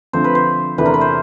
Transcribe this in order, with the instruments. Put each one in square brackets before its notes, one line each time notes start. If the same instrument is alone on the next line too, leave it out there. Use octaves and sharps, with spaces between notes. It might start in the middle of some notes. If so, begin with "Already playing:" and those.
[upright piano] D3 F3 A3 C4 [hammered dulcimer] C5
[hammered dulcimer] B4
C5
[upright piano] E2 C3 E3 A3 D4 [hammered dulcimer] B4
[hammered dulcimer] A#4
B4
C5